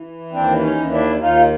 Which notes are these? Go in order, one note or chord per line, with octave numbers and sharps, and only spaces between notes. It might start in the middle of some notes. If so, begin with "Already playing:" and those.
Already playing: E3
D#2 C4 D4
C#4 D#4
D#2
D4 E4
D#2 D#4 F4